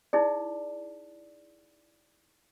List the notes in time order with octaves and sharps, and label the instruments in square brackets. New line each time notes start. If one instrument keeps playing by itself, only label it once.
[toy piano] D#4 E4 G#4 D5